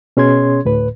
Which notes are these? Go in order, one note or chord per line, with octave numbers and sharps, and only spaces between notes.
B2 C#4 G#4 C#5 C6 G#6
D2 A2 B4